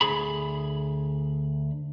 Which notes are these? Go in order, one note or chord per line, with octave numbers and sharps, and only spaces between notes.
D2 G#4 B5